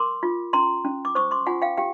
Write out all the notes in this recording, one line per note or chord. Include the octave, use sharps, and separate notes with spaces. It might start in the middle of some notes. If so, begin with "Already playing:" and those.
Already playing: A#4 C6 D6
F4
C#4 A#5 C6
C#4
D6
C5 C#6 D#6
C6 D6
F4 F#5 G#5
F5 G5
G4 F5 G5